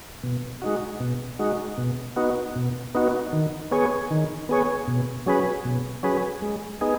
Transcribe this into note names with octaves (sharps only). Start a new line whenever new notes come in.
B2
G#3 D#4 F#4
B2
G#3 D#4 F#4
B2
B3 D#4 F#4
B2
B3 D#4 F#4
D#3
B3 G#4 C#5
D#3
B3 G#4 C#5
B2
F#3 C#4 G#4 B4
B2
F#3 C#4 G#4 B4
G#3
B3 D#4 G#4